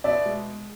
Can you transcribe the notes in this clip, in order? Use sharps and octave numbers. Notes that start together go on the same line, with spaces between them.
B2 D5 E5
G#3